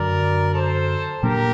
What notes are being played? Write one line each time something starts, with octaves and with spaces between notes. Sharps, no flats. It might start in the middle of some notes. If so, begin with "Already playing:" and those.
Already playing: F#2 D3 F#3 A#4 D5
A4 C5
A#2 F#3 A#3 D4 G4 A#4